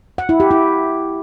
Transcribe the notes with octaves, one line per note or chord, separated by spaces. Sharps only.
F#5
E4
G4
E4